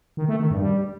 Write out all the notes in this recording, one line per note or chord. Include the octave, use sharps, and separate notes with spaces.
D#3
A3
D#3
G2
G3